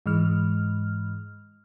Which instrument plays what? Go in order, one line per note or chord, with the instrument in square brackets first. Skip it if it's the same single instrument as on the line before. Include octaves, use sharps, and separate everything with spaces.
[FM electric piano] G#2 E3 G#3 F6